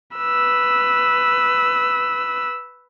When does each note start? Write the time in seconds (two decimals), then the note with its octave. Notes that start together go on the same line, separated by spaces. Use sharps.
0.17 B4 E6